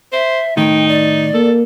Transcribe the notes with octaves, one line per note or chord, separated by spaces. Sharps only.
C5 E5
A2 D#3 D#4 G5
D5
A#3 A4